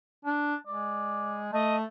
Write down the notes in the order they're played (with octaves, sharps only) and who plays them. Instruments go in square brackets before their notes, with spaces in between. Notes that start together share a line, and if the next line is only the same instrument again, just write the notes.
[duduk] D4
[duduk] G#3 [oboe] D5
[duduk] A3 [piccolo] D#5 [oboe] A5